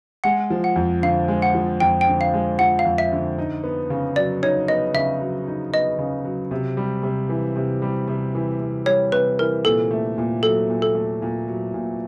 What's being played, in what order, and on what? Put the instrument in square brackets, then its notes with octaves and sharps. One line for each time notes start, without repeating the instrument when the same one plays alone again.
[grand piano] G#3 [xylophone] F#5
[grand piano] F3
[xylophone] F#5
[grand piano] F2
[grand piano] D3 [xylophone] F5
[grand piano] G#3
[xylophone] F#5
[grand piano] F3
[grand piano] F2 [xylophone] G5
[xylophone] G5
[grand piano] D3
[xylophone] F5
[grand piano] G#3
[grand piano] F3 [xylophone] F#5
[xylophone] F5
[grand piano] F2
[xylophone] E5
[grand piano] D3
D#4
B3
C#3
[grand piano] F#3 [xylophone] D5
[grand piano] D#4 [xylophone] C#5
[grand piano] B3 [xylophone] D#5
[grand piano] C#3 [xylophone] E5
[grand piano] F#3
D#4
[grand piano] B3 [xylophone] D#5
[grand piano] C#3
F#3
C3
G3
C3
E3
C3
G3
C3
E3
C3
[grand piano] G3 [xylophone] C#5
[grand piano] C3 [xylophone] B4
[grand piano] E3 [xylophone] A#4
[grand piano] A#2 [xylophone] A4
[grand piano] A3
A#2
[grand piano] F#3 [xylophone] A4
[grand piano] A#2
[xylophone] A4
[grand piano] A3
A#2
F#3
A#2